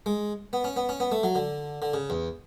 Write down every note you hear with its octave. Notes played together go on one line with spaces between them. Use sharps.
G#3
B3
C#4
B3
C#4
B3
A3
F#3
D3
D3
C#3
E2